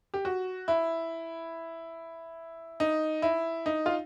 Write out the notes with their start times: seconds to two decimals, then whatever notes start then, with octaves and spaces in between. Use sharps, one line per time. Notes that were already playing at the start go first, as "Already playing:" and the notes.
0.14 G4
0.25 F#4
0.68 E4
2.80 D#4
3.22 E4
3.66 D#4
3.86 F4